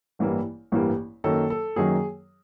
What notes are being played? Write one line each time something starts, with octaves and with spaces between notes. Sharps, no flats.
A1 G2 E3 G3 A#3
A1 G2 E3 G3 A#3
F#2 D#3 F#3 A#3 A4
A4
F#2 D#3 F#3 A#3 G#4